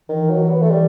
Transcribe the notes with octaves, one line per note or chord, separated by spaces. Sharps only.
D#3 E3
F#3
B3
A3
G3